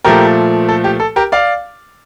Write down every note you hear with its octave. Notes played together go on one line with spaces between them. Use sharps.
A#2 F3 A3 G4 A#4
A4
G4
A4
G4 A#4
D5 F5